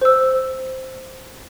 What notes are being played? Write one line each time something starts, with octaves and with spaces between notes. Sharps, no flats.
C5 E6